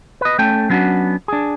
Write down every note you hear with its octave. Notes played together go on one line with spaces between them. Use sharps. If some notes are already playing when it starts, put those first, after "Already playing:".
B4 D#5
A3 C#4 A4 G5
F#3 B3 C#4 D4 F#4
D4 G#4